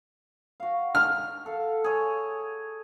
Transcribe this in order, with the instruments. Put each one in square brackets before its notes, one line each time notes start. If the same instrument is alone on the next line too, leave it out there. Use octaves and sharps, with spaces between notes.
[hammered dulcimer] F#4 F5
[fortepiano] F6
[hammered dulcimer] A4 F5
G#4 C#5